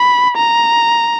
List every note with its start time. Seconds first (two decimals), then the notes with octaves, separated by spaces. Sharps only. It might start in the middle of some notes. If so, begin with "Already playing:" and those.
Already playing: B5
0.36 A#5